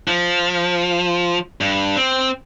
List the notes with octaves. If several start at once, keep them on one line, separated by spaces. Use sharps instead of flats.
F3
G2
C4